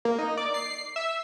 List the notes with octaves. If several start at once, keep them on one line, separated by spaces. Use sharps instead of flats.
A#3
D#4
D5
C7
E5